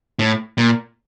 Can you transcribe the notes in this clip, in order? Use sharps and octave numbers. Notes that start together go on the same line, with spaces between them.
A2
A#2